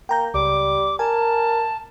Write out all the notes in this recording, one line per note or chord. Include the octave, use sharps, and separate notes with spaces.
A#3 G5 A#5 G6
C#2 G3 D6
A#4 G#5 A5